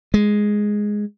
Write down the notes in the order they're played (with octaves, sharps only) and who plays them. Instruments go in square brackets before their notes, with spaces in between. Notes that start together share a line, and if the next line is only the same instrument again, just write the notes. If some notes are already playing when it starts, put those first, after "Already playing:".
[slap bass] G#3